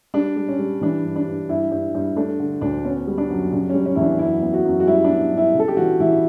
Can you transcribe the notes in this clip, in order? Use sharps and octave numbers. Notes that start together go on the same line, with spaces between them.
G3 D4
G3
C#4
G3
E3 D4
G2
D4
G2
G2 E4
G2
G2
A3 D4
D3
D2 D4
B3 C#4
G3
D4
F#2
C#3 D4
G3 C#4
C#4
E2 E4
D4
F#2 E4
B3
F#4
F#2
F#4
G3 E4
D4
B3
G2
E4
C#3
A4
G4
E3 F#4
E3 E4